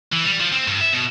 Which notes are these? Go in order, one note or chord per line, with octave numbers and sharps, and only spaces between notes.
E3
G3
F3
C4
G2
E5
B2